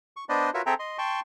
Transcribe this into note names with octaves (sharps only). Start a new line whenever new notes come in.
C#6
B3 D4 B4 C5 D5 D#5
F4 F#4 A#4 B4 C#5 E5
C4 G#4 A4 E5 G5 A#5
D#5 C6
G5 A5 C6 C#6